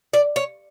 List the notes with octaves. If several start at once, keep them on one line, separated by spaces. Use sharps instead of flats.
D5
C#5